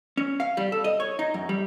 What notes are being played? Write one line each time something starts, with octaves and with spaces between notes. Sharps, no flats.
C#4
F5
G3
A4
D#5
C#5
D#4
F#2
G3